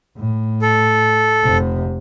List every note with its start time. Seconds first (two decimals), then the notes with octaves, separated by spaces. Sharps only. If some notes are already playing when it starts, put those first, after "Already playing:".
0.17 A2
0.62 A4
1.43 F1 C3